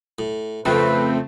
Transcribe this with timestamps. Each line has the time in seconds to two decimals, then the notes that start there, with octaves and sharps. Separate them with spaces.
0.19 A2
0.65 F2 C#3 A3 C4 B4